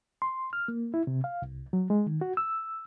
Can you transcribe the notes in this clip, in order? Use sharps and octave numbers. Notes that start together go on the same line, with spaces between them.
C6
F6
A#3
E4
C3
F5
C2
F#3
G#3
D#3
F#4
E6